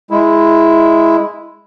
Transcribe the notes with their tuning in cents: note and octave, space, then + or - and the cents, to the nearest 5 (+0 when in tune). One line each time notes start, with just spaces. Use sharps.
G#3 +0 E4 +0